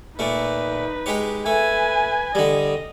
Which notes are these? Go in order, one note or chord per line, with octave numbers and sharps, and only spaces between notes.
A#2 A3 D#4 B4
G#3 G4 C#5
A3 B4 G#5
D3 G3 D#5